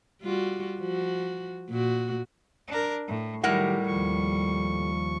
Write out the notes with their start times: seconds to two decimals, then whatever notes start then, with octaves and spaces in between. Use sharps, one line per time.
0.22 G3 F4 F#4
0.80 F3 F#4
1.71 A#2 F#4
2.68 D4 A#4
3.08 A2
3.43 A2 D#3 F#3 G3 G4 A#4 F#5
3.86 D#2 F3 C#6